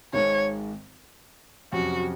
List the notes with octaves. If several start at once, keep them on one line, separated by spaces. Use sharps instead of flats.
G#1 G#2 D#3 G#3 C#5
F2 C3 F#3 C#4 F#4